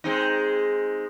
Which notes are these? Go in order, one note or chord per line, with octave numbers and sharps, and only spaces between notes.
G#3 C4 D#4